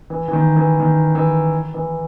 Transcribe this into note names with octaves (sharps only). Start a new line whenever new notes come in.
E3
E3
D#3
E3
D#3
E3
E3